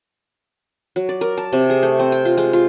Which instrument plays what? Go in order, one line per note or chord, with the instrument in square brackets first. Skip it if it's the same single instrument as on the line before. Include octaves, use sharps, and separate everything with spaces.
[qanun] F#3
D5
A#4
A5
C3
G#4
A3
C4
G5
F4
G#3
F4